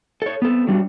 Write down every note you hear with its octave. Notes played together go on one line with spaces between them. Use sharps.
A4 C#5
B3 C4 A4
F#3 G3 D4 F#4